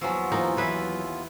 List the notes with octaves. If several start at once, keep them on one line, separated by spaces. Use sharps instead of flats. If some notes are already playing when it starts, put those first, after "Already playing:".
D#2 F3 F#3 B3 F4 G#5 C#6 E6
E3 F3 A#3 D#4
E3 F#3 B4 E5